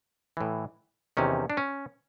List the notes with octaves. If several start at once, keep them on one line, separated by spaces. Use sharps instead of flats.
A2 E3
E2 C3 D#3 C#4
D4
C#4